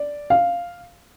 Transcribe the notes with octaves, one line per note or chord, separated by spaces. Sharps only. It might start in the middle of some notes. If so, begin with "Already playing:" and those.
Already playing: D5
F5